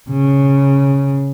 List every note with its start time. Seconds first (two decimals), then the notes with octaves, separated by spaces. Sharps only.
0.10 C#3